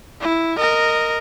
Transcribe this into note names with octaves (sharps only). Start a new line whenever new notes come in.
E4
A#4 D#5